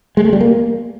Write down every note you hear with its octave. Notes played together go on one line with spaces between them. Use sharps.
G#3
A3
G3
A#3